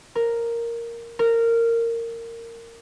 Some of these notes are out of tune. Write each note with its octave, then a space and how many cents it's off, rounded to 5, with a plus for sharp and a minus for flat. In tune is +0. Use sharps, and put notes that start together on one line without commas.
A#4 +0
A#4 -15